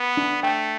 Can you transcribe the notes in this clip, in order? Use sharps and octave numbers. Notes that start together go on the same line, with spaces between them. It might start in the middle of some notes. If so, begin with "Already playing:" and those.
Already playing: B3
D4
A3 G5